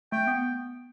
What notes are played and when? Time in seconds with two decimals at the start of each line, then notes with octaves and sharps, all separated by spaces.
0.12 A3 G5
0.27 B3